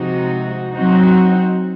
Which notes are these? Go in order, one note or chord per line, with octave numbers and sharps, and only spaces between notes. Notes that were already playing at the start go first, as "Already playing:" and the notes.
Already playing: C3 F3 G#3 D#4 F#4
F#3 C4 D#4 F#4